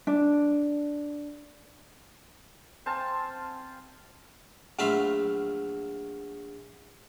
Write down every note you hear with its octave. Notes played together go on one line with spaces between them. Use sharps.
D4
C4 F5 G#5 A5
A#1 F#3 A3 F5 B5 C6